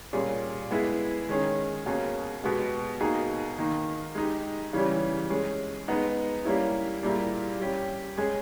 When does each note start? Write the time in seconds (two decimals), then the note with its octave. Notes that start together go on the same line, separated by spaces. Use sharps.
0.13 A#2 G3 C#4 G#4
0.71 G#3 B3 E4 G#4
1.29 D#3 G#3 C#4 G#4
1.86 B2 A#3 C#4 G#4
2.43 B2 G#3 B3 G4
3.01 B2 A#3 D#4 G#4
3.58 D#3 A#3 D#4
4.15 G#3 D#4 G4
4.73 C#3 E3 G3 C#4
5.30 G#3 C#4 G#4
5.88 G#3 B3 D#4
6.45 G3 A#3 C#4 E4
7.03 A#2 G3 A#3 E4 G#4
7.60 G3 C#4 G4
8.17 G#3 C#4 G#4